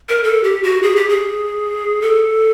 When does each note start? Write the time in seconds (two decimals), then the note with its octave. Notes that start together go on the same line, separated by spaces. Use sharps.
0.09 A#4
0.24 A4
0.44 G4
0.63 F#4
0.83 G#4
0.96 G4
1.09 G#4
2.02 A4